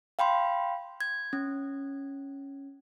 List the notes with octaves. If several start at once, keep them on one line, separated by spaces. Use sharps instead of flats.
F5 G5 B5 C6
G#6
C#4